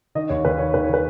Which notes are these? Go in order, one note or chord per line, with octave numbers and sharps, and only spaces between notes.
D#3 D#5
D#2 C#5
D#2 B4
D#3 C#5
D#2 B4
C#5
D#3 B4